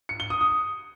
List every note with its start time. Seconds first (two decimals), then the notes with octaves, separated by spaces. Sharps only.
0.09 C#7
0.20 G7
0.30 D#6
0.41 D#6